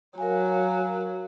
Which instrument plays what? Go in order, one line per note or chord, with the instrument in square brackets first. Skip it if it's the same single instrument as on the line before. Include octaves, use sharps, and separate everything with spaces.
[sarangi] F#3 [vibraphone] A#4 F5 G#5